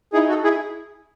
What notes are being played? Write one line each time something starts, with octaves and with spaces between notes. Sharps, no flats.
D#4 E4 G#4
F#4 A4
E4 G#4